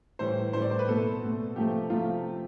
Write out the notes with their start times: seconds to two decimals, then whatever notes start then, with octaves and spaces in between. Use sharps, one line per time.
0.19 A2 E3 G3 C5
0.53 A2 E3 G3 C5
0.62 D5
0.71 C5
0.79 B4
0.87 B2 A3 A4
1.22 B2 A3
1.56 C3 F3 A3 G4
1.90 C3 F3 A3 F4